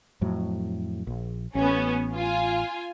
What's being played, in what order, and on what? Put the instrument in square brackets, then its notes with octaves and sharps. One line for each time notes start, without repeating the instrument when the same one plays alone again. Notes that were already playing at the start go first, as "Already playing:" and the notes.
[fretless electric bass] F2 A2 F#3
A#1
[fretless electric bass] A1 [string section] B3 C#4
[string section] F4 G#5